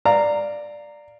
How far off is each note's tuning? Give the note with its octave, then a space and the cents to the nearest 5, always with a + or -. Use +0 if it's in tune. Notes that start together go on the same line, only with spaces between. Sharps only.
D5 +5 F5 +0 A#5 -15